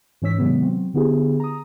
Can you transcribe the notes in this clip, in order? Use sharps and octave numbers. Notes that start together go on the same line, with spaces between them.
G#2 E3 C#4 C#5 E6 B6
C3 D#3 F#3 G#3 B3
F#3 C4
D3 B3 E4 G4 G#4
A#5 D#6